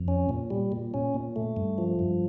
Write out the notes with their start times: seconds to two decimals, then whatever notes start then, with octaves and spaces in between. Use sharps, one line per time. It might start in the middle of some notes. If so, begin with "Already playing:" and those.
Already playing: F2
0.08 C#4
0.29 A#2
0.50 G3
0.72 A#2
0.94 C#4
1.14 A#2
1.36 A3
1.57 G2
1.78 F3
1.99 G2